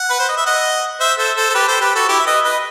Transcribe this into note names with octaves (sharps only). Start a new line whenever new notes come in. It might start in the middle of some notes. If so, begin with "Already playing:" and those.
Already playing: F#5
B4
C5
D#5
E5
D#5 F#5
C5 E5
A4 C5
A4 C5
A4
G4 B4
A4 C5
G4 B4
F#4 A4
E4 G4
E5
B4 D#5
B4 D#5